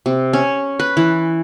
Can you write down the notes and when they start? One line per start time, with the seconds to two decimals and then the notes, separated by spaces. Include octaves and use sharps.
0.06 C3
0.33 C#4
0.79 B4
0.97 E3